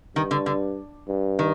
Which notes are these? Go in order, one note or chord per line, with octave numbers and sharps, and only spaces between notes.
G2 D#3
D3
D3
G2
D#3